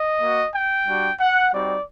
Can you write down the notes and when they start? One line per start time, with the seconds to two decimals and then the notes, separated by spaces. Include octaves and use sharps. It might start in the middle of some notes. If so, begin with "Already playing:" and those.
Already playing: D#5
0.20 A#3 F#4
0.54 G5
0.87 G3 D4 F#4
1.20 F#5
1.53 G3 C4 D#4 F#4 D5